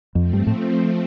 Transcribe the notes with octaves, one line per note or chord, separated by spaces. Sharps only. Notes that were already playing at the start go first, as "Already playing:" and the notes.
F2 F3 A3 C4
G2
A2